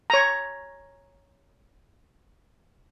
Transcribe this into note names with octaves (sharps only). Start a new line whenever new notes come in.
C#5 A#5